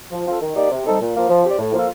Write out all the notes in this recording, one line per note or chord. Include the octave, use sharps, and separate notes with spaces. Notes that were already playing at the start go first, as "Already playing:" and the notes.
F3
C4 F4 A4
D#3
A#3 D#4 G4 D5
C3
G3 C4 D#4 A4
A#2
F3 A#3
F3
C4 G4 D5
A2
F3 A#3 F4 A4